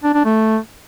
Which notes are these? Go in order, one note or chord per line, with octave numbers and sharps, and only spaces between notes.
D4
D4
A3